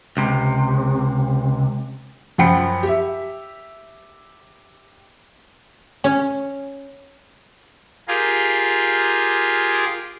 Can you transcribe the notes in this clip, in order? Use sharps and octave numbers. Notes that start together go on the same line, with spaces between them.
C#2 C3
F#2 F3 F#5 G5 B5 C#7
G4 E5
C#4
F4 G4 G#4 A#4